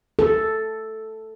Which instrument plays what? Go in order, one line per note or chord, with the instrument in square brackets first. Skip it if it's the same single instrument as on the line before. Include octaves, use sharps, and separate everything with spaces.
[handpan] A4